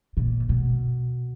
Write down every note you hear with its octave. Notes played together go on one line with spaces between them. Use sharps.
A#2
B2